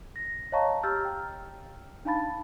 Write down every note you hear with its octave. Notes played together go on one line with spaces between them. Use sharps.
A#6
C#5 D#5 F5 A5 A#5 C#6
G4 A#5 E6 F6 G6 A6
G5
D4 D#4 F5 A5 B5 A6